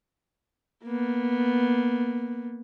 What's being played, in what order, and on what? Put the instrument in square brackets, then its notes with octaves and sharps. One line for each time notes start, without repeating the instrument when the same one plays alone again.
[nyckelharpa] A#3 B3